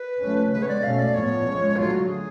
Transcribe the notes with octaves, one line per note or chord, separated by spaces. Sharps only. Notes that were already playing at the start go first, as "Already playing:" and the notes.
Already playing: B4
F3 A3 C#4
C#3 G#3 B3 B4
C#5
D5
B2 A3 C#4 F5
D5
A2 F3 B3 C#5
F3 G#3 C#4
D3 F#3 A3 F4
F#4
G#4